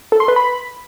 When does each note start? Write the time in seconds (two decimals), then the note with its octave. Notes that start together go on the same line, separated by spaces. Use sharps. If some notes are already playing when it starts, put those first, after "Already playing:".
0.12 A4
0.20 C6
0.28 B4
0.36 B5